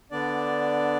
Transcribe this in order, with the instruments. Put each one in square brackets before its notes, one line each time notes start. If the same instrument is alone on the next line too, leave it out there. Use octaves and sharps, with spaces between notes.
[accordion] D3 B3 D4 D5